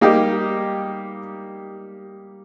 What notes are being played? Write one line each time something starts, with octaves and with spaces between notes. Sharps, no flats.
G3 A#3 D#4 G4